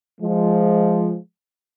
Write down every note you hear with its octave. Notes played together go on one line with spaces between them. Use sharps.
F3 G#3